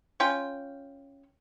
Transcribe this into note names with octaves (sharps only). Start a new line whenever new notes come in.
C#4 F4 G5